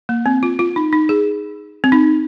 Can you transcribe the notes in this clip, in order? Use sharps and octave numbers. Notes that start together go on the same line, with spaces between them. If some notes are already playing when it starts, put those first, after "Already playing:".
A#3
C4
F4
F4
D#4
D#4
G#4
C4
D#4